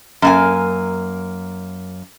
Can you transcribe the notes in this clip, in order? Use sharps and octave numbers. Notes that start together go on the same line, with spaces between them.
F#2 A#3 G#5